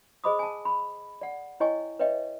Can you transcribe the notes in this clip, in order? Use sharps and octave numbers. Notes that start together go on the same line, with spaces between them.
G#4 C5 D#5 B5 D6 D#6
G#5 A5
B5
D5 F#5
E4 C#5 D#5 G5 G#5 C#6
B4 C#5 D#5 E5 G5